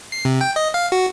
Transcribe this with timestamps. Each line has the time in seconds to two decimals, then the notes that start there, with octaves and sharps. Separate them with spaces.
0.12 C7
0.25 C3
0.41 G5
0.56 D#5
0.74 F5
0.92 F#4